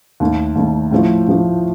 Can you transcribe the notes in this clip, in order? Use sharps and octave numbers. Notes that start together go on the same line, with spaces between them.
D#2 D#3 A3
D#2 D#3 A3
A2 F3 A3
A2 F3 A3